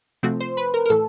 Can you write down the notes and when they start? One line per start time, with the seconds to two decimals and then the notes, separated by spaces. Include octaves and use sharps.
0.23 C3 F3 A3 C4 F#4
0.40 C5
0.57 B4
0.74 A#4
0.86 A#4
0.90 A2 E3 A4